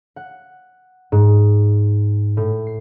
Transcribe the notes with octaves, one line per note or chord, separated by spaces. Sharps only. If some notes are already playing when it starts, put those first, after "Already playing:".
F#5
G#2
A2
C7